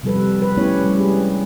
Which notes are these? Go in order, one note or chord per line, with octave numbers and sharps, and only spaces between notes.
C3 F3 G3 A4 B4
G3 B4
A3 B3 C#4 E4 G4 C#5
G3
G#3 D4 G#4